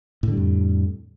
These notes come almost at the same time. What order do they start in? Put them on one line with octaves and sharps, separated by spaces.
A2 D3 G3 F2